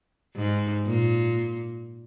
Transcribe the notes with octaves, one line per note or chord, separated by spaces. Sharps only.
G#2
A#2